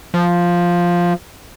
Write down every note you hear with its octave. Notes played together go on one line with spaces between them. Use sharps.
F3